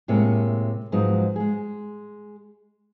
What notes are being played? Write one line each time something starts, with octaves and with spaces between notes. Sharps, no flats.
A2 C3 G#3 A#3
G#2 F3 F#3 G#3 B3 D#4
G#3 G#4